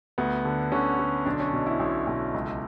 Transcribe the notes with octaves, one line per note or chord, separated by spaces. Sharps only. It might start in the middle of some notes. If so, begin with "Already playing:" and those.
D2 B3
D3
D3 C#4
D3
B1 D4
C#4
B2
E4
B1
B1
C#2